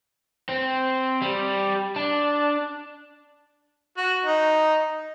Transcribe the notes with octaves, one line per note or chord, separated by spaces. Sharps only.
C4
G3
D4
F#4
D#4